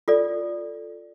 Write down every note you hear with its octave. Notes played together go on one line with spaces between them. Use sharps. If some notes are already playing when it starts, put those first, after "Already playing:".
F4 A4 D5